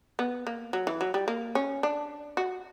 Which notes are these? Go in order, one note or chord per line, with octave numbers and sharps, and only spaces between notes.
B3
A#3
F#3
E3
F#3
G3
A#3
C#4
D4
F#4